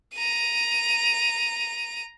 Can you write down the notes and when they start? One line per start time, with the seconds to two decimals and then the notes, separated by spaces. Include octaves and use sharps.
0.14 A#5 D#7